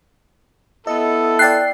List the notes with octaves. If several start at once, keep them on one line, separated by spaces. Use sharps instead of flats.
B3 E4 A4 D#5
D5 G5 F#6 A6 C7